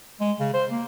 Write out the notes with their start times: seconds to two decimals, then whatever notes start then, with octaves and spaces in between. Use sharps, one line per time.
0.20 G#3
0.40 C#3
0.54 C5
0.71 A#3